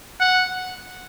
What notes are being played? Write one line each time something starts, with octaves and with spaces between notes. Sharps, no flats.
F#5